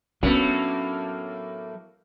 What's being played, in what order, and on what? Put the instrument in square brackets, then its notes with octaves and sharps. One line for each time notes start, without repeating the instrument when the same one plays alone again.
[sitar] A2 A#3 [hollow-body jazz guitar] F#3 B3 [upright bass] C#4 D4